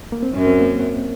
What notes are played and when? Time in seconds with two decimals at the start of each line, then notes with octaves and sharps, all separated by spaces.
0.12 A#3
0.23 C4
0.34 F#2 C#4
0.47 C4
0.60 A#3